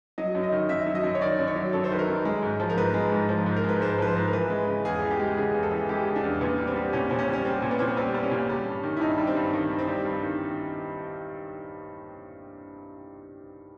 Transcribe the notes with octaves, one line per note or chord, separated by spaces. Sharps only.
F#3 D#5
F#2
D#5
D#3
F#2 E5
F#3
D#5
F#2
C#5
D#3 D5
F#2
C#5
F#3
F#2 A4
C5
D#3 B4
A#4
F#2
G#3
G#2
F3
A#4
G#2 B4
G#3
G#2
F3
G#2
A#4
G#3 B4
G#2 C5
F3 B4
C5
G#2
A#4
E3 B4
G#3
C#3
E2 G#4
E3
G4
G#3
C#3 G#4
E2
A4
E3
G#3 G4
C#3
D4
E2
A#2 B3
G3
C4
G3
A#2 C#4
A#2 C4
C#4
G3
C#4
G3 C4
A#2
B3
A#2 C4
B3
G3 C4
G3
C#4
A#2
G3
G2
D#3
E4
G2 D#4
G3
C4
G2
D#3
G2
C4
G3
G2
D#3